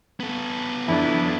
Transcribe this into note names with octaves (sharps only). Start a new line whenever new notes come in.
B3 A4
F2 D4 E4